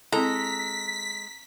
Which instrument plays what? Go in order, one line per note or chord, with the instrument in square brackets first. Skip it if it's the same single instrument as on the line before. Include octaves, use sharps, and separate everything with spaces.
[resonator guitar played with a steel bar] G#3 A4 [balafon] C4 E4 [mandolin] A#5 [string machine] B6